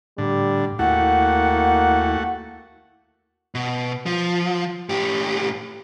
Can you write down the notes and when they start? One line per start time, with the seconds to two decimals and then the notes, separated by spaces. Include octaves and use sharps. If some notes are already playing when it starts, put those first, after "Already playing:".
0.18 A2 D3 G3
0.79 D#2 A3 A#3 E4 F#4 F#5 G5
3.55 B2
4.06 F3
4.89 A2 G4